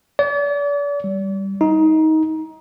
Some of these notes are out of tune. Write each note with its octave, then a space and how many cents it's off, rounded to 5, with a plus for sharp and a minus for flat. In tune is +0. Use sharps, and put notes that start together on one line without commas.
D5 -40
G3 -5
D#4 +20